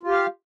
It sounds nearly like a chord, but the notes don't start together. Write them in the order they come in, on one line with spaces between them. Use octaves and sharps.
F4 G4 F5